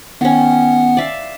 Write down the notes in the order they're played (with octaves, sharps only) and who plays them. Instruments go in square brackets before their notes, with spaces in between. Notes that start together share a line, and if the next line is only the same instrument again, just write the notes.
[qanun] D#3 C#4 [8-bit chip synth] B3 F#5
[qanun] D5 E5 F5